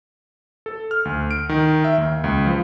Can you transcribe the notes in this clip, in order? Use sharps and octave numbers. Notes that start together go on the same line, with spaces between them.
A4
F6
D2
D7
D#3
E5
D#2
C#2
F3